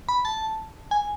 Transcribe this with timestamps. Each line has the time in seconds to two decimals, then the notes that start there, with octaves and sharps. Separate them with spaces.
0.09 B5
0.25 A5
0.91 G#5